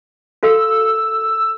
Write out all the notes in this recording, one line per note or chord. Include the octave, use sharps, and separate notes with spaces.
F#4 A4 F5 E6